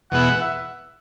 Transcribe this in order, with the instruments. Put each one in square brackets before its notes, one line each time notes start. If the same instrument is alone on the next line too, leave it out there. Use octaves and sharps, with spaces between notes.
[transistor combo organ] E2 B2 G#3 B3 E4 [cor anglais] F#5
[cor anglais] E5